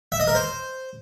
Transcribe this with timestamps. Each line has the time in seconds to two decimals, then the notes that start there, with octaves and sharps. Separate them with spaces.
0.12 E5
0.20 D#5
0.27 A#4
0.35 C5